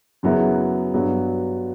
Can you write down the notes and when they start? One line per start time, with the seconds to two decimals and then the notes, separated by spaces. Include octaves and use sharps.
0.23 F#2 C#3 F#3 B3 E4
0.94 G2 F#3 B3